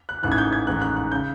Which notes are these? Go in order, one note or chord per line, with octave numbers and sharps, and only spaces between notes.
F#6
A1 G#2 E3 F#6
G#6
G6
G#6
A1 G#2 D#3 F#6
F#6
F#6
C#3 G6